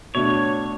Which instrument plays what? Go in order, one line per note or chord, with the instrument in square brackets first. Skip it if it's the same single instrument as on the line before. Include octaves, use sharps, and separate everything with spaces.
[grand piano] B2 A3 D4 [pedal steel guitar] C#5